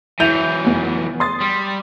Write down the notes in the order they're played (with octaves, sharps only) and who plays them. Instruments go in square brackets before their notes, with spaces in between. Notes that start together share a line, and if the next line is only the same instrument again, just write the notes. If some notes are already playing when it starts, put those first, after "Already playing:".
[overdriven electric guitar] E3 F#3 [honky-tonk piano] E4 G6 F7
[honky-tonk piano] F1 B3
C6 D#6 A6
[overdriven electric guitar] G3